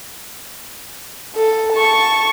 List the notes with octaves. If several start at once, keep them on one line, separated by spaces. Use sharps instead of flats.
A4
A5 C#6